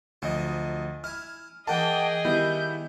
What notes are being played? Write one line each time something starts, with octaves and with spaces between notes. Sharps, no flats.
D2 F3 F#3 D#5
E4 G#5 F6
E3 A#3 G#4 D#5 F#5 G5 A5
D#3 G3 B3 E4 G6